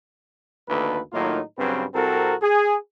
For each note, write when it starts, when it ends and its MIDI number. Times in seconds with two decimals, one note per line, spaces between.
0.69 1.00 38
0.69 1.00 43
0.69 1.00 51
0.69 1.00 58
0.69 1.00 69
0.69 1.00 71
1.13 1.40 45
1.13 1.40 51
1.13 1.40 54
1.13 1.40 58
1.13 1.40 63
1.13 1.40 65
1.58 1.85 43
1.58 1.85 49
1.58 1.85 54
1.58 1.85 60
1.58 1.85 71
1.94 2.34 36
1.94 2.34 60
1.94 2.34 66
1.94 2.34 69
1.94 2.34 70
2.42 2.77 68